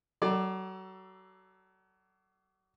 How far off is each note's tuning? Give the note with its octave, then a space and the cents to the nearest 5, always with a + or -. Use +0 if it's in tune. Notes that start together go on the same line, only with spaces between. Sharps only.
F#3 +35 A4 +15 D5 +10